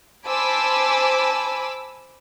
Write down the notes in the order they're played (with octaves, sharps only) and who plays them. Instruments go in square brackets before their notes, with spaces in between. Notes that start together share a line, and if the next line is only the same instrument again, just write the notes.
[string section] C5 G#5 A5 B5 D6 E6